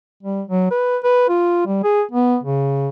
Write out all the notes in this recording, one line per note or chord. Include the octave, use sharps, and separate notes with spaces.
G3
F#3
B4
B4
F4
G3
G#4
B3
C#3